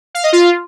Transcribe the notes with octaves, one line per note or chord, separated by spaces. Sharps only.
F5
D#5
F4